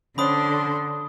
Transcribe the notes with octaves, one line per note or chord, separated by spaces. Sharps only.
D3 C#4 D4 C5 C#5 B5 C6 D#6